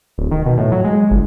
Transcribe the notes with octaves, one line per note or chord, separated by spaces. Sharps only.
D1
D#3
B2
A2
F#3
G#3
G1